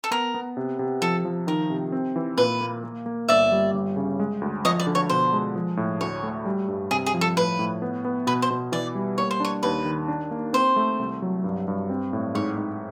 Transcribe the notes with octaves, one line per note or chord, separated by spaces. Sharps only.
A4
B3 A#4
B3
C3
C3
F3 A4
F3
D#3 A#4
C3
C4
E3
A#2 B4
A#3
A#3
A#3
G1 D5 E5
G3
G1
C#3
G#3
D2
F3 C#5 D#5
D5
D3
C#5
B2 C5
G#3
F3
A2
D2 C#5
A3
G3
G2
C3 G#4
G#4
F3
A4
A2 B4
A2
B3
B3
B2 B4
C5
B2
E3 D5
G3
A#3 C#5
C5
D4 C#5
D#2 B4
D#3
D4
A#3
C4 C5
A3
C2
F#3
G2
G2
C4
A2
G#2 C#5
G#2